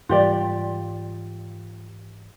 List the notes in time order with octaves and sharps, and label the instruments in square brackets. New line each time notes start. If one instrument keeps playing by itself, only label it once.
[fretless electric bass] G#2 E3 G3 [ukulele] F4 G4 D5